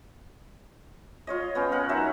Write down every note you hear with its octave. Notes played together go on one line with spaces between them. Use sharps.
F4 C#5 D#5
B3 C#4 G5
A#4 F#5
F#3 D#4 E5 A#5